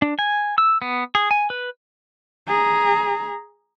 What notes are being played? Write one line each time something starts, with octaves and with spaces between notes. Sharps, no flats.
D4
G#5
E6
B3
G#4
G#5
B4
G#4 A#5